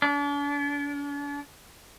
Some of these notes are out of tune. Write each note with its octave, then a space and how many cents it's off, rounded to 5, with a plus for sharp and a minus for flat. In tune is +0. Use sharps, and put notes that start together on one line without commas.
D4 -45